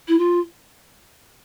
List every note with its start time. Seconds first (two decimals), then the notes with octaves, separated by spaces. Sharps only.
0.08 E4
0.18 F4